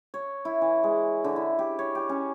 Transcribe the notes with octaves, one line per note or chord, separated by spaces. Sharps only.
C#5
E4
E3
G#3
D3
E4
G4
C#5
G4
C#4